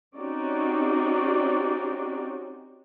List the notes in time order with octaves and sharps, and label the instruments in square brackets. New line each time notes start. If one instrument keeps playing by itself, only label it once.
[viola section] C4 C#4 D#4 F#4 G4 D5